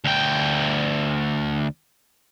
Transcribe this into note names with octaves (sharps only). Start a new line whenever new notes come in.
D2 G5